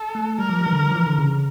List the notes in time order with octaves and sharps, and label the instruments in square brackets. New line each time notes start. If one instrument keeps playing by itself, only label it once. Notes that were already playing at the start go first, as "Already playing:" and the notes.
Already playing: [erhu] A4
[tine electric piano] A3
[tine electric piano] G3 [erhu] A#4
[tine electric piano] F3
G3
E3
D3
F3
E3
D3
C#3